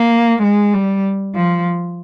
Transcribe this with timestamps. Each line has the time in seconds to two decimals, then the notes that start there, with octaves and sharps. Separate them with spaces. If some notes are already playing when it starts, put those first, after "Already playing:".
Already playing: A#3
0.43 G#3
0.74 G3
1.35 F3